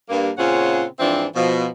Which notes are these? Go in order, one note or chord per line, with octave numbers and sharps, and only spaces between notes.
G2 A#3
A#2 C#3 C4 C#4 F4 F#5
G#2 E3 F3 C4 D4 E5
B2 F3